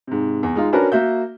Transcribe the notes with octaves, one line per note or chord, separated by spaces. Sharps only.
G#2 C3
E2
G#3 D#4 F4
C#4 D4 F#4 A#4 B4
A#3 F#4 E5 G6